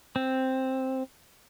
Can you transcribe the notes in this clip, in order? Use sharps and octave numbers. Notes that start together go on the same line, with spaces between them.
C4